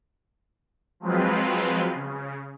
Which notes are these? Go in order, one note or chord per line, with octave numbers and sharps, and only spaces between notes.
F3 F#3 G#3 C4 F4 B4
C#3